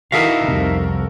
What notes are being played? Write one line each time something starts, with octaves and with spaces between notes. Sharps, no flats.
E3 D#4 F#4 A4 A#4 E5 F5
C2 F2 C3